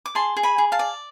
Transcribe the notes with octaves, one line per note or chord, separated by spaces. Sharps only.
D6
G#4 A5 C6
G#4
G#5 B5
G#4
F5 A5
D5